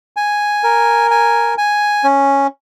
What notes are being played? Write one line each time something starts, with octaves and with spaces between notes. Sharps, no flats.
G#5
A#4
G#5
G#5
C#4